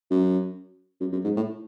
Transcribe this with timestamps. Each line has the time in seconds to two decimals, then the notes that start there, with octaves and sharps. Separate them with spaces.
0.11 F#2
1.01 F#2
1.13 F#2
1.24 G#2
1.36 A2